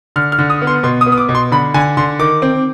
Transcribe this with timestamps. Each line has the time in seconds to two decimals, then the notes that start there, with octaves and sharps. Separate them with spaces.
0.16 D3 F6
0.32 F6
0.38 D3
0.50 D#6
0.62 B3
0.67 C6
0.83 B2 C6
1.01 D#6
1.06 B3
1.12 D#6
1.18 D6
1.29 B2
1.35 C6
1.52 D3 B5
1.74 D3 G#5
1.97 D3 C6
2.19 D#3 D6
2.42 C4